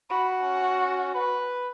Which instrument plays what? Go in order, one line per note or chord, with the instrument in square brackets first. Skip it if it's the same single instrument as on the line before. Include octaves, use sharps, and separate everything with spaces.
[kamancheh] F#4 [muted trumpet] B5
[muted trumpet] C#4
B4